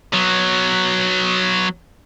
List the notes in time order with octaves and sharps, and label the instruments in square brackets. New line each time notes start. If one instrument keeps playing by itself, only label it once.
[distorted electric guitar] F#3 B3